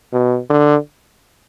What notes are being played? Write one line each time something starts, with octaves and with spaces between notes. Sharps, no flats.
B2
D3